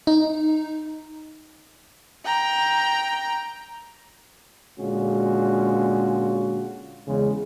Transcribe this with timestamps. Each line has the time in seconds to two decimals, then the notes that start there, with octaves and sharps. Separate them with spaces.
0.07 D#4
2.26 G5 A#5
4.80 A#2 D3 G#3 C#4 F4 F#4
7.08 E2 C#3 G#3